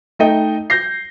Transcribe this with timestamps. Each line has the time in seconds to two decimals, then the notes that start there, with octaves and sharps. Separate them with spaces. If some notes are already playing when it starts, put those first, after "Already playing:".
0.19 A3 D#4 D#5 G5
0.70 G6 A#6 C7